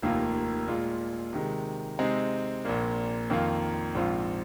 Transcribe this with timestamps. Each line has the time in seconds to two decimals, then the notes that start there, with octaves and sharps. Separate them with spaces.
0.02 F1 D#2 D#3 A#3 F4
0.68 A#2 G#3 F4
1.33 C3 D#3 G#3
1.99 C3 G#3 C4 D#4 G#4
2.65 A#1 A#2 A#3
3.30 F2 D#3 A#3 F4
3.95 A#1 G#2 F3 C4 F4